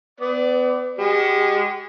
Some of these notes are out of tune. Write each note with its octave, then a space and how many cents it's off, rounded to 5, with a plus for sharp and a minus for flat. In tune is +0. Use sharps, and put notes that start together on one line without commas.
B3 +35 D5 +0
G#3 -30 G4 -45